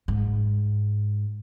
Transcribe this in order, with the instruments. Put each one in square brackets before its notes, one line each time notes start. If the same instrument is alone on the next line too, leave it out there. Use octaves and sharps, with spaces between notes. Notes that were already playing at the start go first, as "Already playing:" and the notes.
[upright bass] G#2